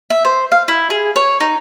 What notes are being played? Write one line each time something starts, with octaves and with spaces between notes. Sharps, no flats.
E5
C5
F5
E4
G#4
C#5
D#4